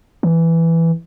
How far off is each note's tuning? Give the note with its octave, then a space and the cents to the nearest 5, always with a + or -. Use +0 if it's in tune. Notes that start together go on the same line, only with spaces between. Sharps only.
E3 +5